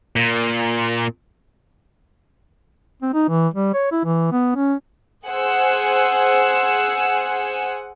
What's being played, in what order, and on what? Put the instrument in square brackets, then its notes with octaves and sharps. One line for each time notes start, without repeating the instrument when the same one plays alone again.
[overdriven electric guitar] A#2
[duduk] C4
D#4
E3
G3
C#5
E4
E3
B3
C#4
[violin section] G#4 C5 F#5 G#5 E6